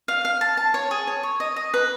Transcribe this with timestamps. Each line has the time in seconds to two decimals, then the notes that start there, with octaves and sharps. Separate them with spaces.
0.08 F5
0.25 F5
0.41 A5
0.57 A5
0.74 C#5
0.91 G#4
1.07 C#5
1.23 C#5
1.40 D#5
1.56 D#5
1.74 B4